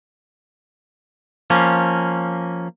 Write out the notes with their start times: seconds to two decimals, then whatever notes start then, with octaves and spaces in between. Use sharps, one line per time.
1.50 F3 A#3 C#4